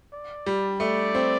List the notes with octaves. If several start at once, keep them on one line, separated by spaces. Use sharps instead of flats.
D5
G3
A3 D5
C4